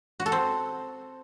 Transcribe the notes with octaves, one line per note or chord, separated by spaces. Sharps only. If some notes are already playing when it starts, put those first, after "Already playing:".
F#4
A4
C4